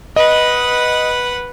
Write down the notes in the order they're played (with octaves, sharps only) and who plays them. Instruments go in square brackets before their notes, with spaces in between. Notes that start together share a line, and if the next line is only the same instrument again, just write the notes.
[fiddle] B4 F#5 [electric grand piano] D#5